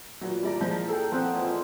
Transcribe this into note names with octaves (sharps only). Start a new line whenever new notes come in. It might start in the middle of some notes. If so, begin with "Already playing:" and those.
A#2 E3 F#3
G3 D5 A#5
F3 G#3 A#4
G#4 A4 G5 A#5
F3 C4 A4 C5 D#5 F#5
A#2 E3 G#3